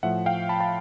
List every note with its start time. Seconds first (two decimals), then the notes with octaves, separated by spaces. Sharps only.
0.03 A2 F3 A3 E5 F#5
0.26 F5 G5
0.49 A5 B5
0.60 A5 B5